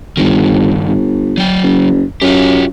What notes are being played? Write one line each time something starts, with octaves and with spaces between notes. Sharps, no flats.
G1 G2 D#3
G1
F#3 G5
F#1
F#2 F4 G4